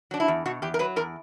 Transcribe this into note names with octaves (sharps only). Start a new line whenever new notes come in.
F#3 D4
E4
E2
B2 F#4
E2 G4
A#4
F#3 B4
E2 A#4